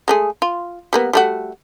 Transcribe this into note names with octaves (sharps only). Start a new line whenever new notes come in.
G#3 A3 G#4
F4
G3 A#3 B3
G3 A3 F#4